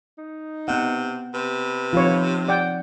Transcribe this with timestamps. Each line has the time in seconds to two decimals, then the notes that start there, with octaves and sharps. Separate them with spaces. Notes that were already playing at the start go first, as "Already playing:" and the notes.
0.18 D#4
0.68 C3 B3 F#5
1.34 C3 B4
1.93 F3 C4 D#4 F4 C#5
2.48 D5 F#5 G5